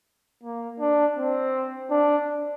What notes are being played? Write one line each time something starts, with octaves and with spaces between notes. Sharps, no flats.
A#3
D4
C4
D4